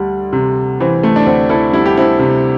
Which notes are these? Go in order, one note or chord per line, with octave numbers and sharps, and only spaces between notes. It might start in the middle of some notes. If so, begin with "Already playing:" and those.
Already playing: D2 G3
C3
E3 C4
A3
D4
D2 C4
E4 A4
G3 E4
G4
C4 E4
C3